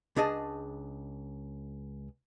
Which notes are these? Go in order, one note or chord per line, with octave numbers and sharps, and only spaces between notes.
C#2 D4 G#4 D#5 A5